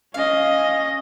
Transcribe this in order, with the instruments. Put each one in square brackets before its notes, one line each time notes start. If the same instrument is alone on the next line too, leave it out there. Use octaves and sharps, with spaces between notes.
[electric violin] C#4 D#5 [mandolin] F5